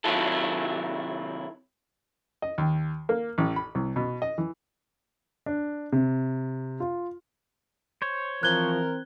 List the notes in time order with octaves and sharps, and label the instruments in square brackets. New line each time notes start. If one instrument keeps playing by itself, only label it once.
[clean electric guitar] C3 D#3 F#3 E4 F4 A4
[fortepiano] D#5
D#2
A#3
A1
B5
C2
B2
D#5
E3
[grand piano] D4
C3
F4
[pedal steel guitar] C5 C#5
[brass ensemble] E3 C4 A#4 [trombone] F3 [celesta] F#6 G#6 G7